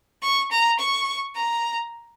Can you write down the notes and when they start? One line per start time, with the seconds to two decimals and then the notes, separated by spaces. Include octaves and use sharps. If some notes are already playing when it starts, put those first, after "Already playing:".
0.22 C#6
0.51 A#5
0.79 C#6
1.35 A#5